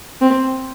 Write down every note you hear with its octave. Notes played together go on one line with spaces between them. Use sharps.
C4